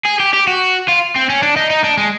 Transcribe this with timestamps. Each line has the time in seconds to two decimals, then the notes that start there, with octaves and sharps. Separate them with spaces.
0.06 G#4
0.20 G4
0.34 G4
0.48 F#4
0.88 F4
1.16 C4
1.30 C#4
1.43 D4
1.56 D#4
1.70 D#4
1.84 D4
1.97 G#3